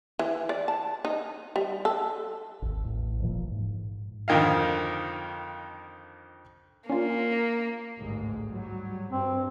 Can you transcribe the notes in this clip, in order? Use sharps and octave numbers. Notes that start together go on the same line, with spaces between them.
E3
D5
A5
D#4
G3
A4
G#1 D#2
A1
D#1 A#2 E3 F3
G#2
F2 D3 D#3 D#5 F5
A#3 C#4 D4 F4
A1 D2 G#2
F#3 G3
G2 C4